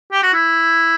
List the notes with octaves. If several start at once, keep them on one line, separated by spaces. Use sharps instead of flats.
G4
F#4
E4